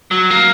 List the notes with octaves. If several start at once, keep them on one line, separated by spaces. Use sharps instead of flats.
F#3
A#3